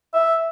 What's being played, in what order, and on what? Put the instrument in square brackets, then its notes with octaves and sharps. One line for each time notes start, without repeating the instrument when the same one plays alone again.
[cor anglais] E5